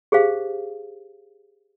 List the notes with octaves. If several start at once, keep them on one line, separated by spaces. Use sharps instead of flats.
G4 G#4 C5 F5